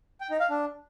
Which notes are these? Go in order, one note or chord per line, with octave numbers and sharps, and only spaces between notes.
G5
D#4
F5
D4